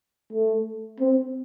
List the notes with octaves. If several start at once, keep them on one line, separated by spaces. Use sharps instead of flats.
A3
C4